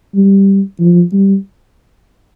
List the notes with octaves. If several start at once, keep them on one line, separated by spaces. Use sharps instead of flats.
G3
F3
G3